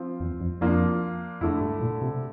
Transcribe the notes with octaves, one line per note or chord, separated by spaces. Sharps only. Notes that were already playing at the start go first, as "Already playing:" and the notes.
Already playing: F3 C4 F4
E2
F2
F2 F3 A#3 D4 F4
F2 D3 A3 E4
G2
A#2
C3